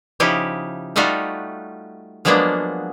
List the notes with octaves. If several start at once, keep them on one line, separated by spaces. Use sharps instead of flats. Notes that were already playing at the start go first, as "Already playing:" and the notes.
C#3 F3 D#4 E4 G4
G3 A3 D#4 F4 F#4
F3 F#3 G#3 A#3 B3 D4